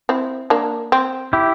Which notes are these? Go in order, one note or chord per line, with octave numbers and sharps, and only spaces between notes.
C4 E4
A#3 D4
C4
E4 G4